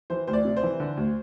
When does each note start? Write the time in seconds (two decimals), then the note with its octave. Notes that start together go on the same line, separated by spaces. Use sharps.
0.10 E3 C5
0.27 D2 C5
0.33 D5
0.45 C3
0.57 C5
0.63 E3
0.80 D3
0.97 D2